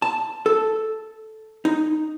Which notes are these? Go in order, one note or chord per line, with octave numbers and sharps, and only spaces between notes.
A5
A4
D#4